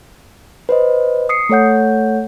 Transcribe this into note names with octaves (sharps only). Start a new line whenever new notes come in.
B4 C5 D#5
D#6 C7 C#7
A3 A4 C#5 F#5 G6